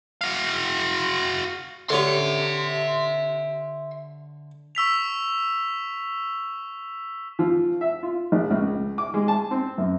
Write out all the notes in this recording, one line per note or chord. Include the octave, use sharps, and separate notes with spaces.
F#4 F5
D3 G4 A4 C#5 E5 A#5 C6
C#6 E6 B6 F7
F3
E5
F4
A#1
C#2
D6
G#3
A5
C4
F#2